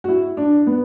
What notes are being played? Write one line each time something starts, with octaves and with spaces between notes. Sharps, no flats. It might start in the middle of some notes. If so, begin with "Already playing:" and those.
F#4
E4
D4
B3